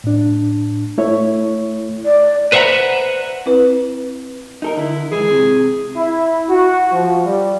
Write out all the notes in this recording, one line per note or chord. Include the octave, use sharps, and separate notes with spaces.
A2 D4
A3 E4 C#5
D5
B4 C5 E5 F#5 A#5 B5
C4 E4 B4
D#4 A4 A#4
D3 E4
G#2 E3 G#4
C3
E4
F#4
F3
G3